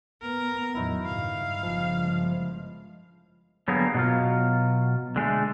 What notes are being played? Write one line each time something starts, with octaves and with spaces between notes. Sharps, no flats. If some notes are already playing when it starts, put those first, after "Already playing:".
B3 A#4
E2 A2 D#3 F#3 E4
G2 C#3 F5
G1 C#3 F3 G#3
D3 F#3 G3 A#3 B3 G#4
B2 F#3 F4
D3 G#3 A3